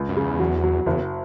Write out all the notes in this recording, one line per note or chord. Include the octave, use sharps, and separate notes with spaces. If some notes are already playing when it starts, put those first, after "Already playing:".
Already playing: C#2
F#2
C#3
E2
F#3
F#3
F#1 E2